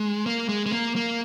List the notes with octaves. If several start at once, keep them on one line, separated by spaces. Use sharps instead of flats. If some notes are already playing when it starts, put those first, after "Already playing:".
Already playing: G#3
A#3
G#3
G#3
A#3
A#3